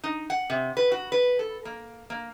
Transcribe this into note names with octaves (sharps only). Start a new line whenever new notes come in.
D#4
F#5
C3
B4
F#4
B4
A4
A#3
A#3